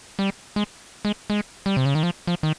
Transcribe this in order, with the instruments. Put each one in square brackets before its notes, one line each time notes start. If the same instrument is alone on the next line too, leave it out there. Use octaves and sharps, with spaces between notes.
[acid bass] G3
G#3
G#3
G#3
G3
C3
C#3
D#3
F3
F3
D#3